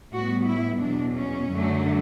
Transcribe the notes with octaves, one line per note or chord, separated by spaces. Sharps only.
A2 G3 B3 F#4
E4
E2 B2 F#3 D4
C#4
F#2 D3 F#3 A3